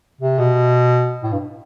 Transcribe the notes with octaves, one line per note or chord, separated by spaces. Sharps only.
C3
B2
A2
G2